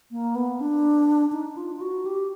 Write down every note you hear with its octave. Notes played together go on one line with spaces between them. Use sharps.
A#3
B3
D4
D#4
F4
F4
F#4
G4